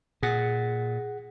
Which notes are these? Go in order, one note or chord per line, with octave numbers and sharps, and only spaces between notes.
A#2 G#4 F#5